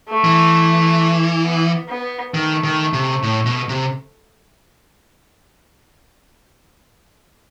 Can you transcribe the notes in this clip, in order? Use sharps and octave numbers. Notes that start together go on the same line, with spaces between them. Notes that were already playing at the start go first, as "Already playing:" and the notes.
A3
E3
B3
B3
D#3 A3
D#3
C3
A2
B2
C3